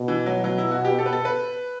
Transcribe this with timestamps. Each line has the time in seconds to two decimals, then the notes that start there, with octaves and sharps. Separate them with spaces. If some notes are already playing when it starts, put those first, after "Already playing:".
Already playing: B2
0.08 E3
0.26 F#3
0.44 F#3
0.58 E4
0.71 F#4
0.85 G4
0.99 A4
1.06 B4
1.13 A4
1.25 B4